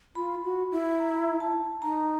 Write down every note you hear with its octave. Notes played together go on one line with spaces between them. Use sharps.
F4 B5
F#4
E4
A#5
A5
D#4 A#5